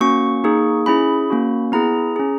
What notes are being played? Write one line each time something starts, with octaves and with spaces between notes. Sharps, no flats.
A#3 C#4 F#4 C#6
A#3 D#4 G#4
C#4 E4 G#4 B5
A#3 C#4 F#4
B3 E4 G#4 A#5
C#4 G#4